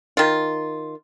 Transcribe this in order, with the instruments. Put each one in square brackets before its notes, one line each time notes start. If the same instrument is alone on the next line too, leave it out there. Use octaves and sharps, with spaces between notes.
[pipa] D#3 F4